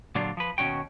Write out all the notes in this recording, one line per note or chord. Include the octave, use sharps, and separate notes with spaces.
A#2 D3 F#3 D4 F4
F3 B4
D#2 B2 D#3 C#4 F#4 G5